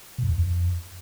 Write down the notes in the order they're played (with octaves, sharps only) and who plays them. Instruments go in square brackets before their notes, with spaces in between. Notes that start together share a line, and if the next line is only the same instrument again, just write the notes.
[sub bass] B2
F#2
E2
F#2
F2